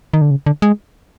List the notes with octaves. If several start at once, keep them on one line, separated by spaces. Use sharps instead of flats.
D#3
D3
C#3
D3
G#3